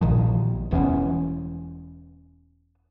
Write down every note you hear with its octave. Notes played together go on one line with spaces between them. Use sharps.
A#1 A#2 D#3 F3
E1 E3 B3 C#4